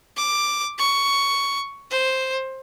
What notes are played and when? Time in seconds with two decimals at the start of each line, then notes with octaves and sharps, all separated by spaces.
0.17 D6
0.79 C#6
1.91 C5